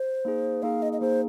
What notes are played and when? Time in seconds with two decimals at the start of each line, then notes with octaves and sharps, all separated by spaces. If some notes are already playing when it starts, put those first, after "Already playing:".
Already playing: C5
0.25 A#3 D#4 G#4
0.63 A#3 D#4 G#4 F5
0.82 D#5
0.93 D#5
1.01 A#3 D#4 G#4 C5